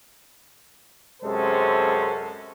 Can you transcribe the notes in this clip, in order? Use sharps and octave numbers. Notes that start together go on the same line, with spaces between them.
F#2 C3 G#3 C#4 A4 C5